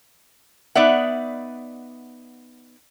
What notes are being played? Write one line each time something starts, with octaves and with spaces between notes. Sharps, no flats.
B3 D#4 D5 E5 F#5